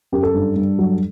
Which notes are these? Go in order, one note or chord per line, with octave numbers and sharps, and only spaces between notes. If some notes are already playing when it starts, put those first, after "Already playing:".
F#2 G4
A4
G2
G2
F#3